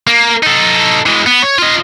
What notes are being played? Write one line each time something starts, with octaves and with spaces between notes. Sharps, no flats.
A#3
D#4 A4
E3 G#3
B3
C#5
F4 D#5